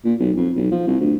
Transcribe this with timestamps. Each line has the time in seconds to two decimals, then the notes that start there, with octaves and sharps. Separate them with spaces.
0.04 A#2
0.20 B1
0.37 F2
0.56 B1
0.71 F3
0.87 C2
1.00 D2